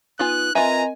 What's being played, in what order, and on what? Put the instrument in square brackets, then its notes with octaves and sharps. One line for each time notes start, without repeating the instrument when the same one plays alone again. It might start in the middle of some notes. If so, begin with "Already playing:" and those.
[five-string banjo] B3 F4 G#5 [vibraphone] D#4 [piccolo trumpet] F#6
[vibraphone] C4 A#4 D#5 [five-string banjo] F4 B4 E5 [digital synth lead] G#5 [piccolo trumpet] A#5